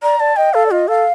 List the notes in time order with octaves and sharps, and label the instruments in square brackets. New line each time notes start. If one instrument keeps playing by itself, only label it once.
[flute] D5 [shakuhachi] A#5
[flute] D5 [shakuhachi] A5
[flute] D#5 [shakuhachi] G5
[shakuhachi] A4 [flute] F5
[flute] D5
[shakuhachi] F4 [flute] D#5
[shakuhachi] A4 [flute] F5